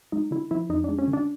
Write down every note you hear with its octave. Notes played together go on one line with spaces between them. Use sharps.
G#3 D#4
D3 E4
F3 E4
F2 D#4
G#3 D4
C#4
D3
D4